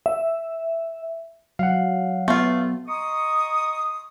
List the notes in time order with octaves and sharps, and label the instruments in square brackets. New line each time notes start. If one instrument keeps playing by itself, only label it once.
[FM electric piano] E5
[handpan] F#3 [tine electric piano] F5 F#5
[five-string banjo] A3 F4 [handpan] B3
[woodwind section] D#5 A#5 C6 C#6 D#6